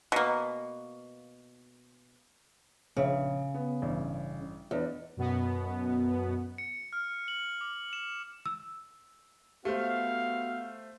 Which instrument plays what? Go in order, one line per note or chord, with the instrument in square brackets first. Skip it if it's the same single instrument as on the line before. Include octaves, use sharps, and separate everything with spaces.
[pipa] B2 A#3
[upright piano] A#1 D4 E5 [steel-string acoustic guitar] C#3
[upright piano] B3
A1 G2
[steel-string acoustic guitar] E2 [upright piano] D4 D#5
[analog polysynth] F#2 B2 B3
[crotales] C#7
F6
F#7
D6
E7
[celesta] E6
[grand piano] A3 C5 [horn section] B3 F#4 F5 [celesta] G4